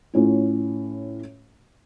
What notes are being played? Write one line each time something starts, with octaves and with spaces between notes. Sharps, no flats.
A2 C#4 F4